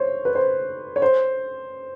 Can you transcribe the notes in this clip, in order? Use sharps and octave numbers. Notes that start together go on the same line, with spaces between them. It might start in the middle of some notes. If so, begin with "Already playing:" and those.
Already playing: C5 C#5
B4
C5
C#5
C5